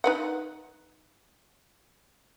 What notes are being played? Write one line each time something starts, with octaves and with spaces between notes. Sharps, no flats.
D#4 B4 F#5